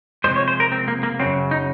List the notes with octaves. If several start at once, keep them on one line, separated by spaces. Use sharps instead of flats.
C3 F3 G#3 C5
C#5
C5
A#4
C4
A#3
A#3
F#2 C#3 F#3 C4
D#4